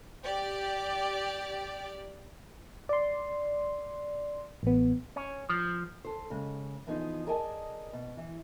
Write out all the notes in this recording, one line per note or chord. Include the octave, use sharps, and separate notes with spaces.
G4 D5
D5 C6
A1 B3
C#4
F3
A4 C5
C#3 G#3
E3 F3 B3 D#4 G#4 C5
G#4 A#4 D5 D#5 G#5 A5
B2
E3